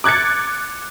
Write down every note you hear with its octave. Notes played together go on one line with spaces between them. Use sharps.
D6 F#6 G#6 A6 C#7